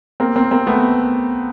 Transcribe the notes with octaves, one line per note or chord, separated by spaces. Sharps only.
A#3 C4
A#3 C4
A#3 C4
A3 B3